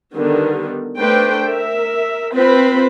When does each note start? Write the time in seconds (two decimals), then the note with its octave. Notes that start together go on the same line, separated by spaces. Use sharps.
0.15 D3 D#3 G3 B3
0.98 A3 D4 B4 C5 G5
1.45 A#4 E5
2.34 C4 F4 B4 C5 B5